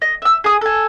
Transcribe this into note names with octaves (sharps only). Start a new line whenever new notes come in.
D#5
E5 E6
G#4 D#6
A4 G#5